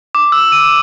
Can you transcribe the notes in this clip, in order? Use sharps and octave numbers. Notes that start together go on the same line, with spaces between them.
D6
E6
D#7